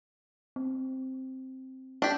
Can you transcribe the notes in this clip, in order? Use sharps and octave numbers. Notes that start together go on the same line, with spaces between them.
C4
C#4 D4 G4